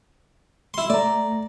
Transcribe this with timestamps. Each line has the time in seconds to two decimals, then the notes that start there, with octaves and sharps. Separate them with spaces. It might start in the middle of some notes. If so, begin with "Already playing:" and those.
0.74 E4 C6
0.90 A3 D5 A#5